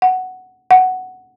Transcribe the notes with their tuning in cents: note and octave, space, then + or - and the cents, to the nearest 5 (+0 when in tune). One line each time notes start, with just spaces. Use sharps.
F#5 +5
F#5 +5